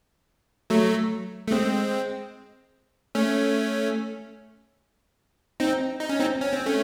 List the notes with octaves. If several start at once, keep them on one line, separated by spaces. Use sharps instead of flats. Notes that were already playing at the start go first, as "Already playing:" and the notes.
F#3 A3
A3
G#3 C4
A3 C#4
C4 D#4
D#4
C#4
C4 D#4
C#4
C4
A3 C#4